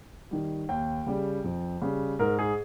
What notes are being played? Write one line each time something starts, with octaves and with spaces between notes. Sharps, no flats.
D#3 G3
D#2 G5
C#3 G3
F2
C#3 G3
G#2 A#4
G#4